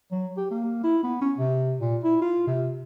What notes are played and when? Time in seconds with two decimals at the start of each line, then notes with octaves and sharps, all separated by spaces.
0.12 F#3
0.37 G4
0.51 A#3
0.84 E4
1.03 B3
1.21 C#4
1.38 C3
1.81 A#2
2.03 E4
2.21 F4
2.47 C3